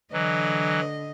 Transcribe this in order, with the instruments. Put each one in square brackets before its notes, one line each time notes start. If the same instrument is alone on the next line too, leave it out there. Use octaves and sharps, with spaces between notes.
[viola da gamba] D3 D#5 [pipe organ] E3 F#3